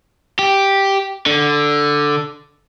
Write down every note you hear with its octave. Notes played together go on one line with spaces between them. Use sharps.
G4
D3